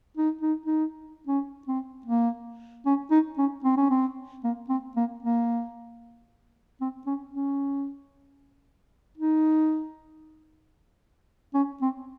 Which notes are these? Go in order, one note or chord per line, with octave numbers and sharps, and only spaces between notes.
D#4
D#4
D#4
C#4
C4
A#3
C#4
D#4
C#4
C4
C#4
C4
A#3
C4
A#3
A#3
C4
C#4
C#4
D#4
C#4
C4